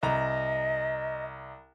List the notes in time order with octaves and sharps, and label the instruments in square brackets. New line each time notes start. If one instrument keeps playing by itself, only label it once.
[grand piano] C2 A#5 [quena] D#5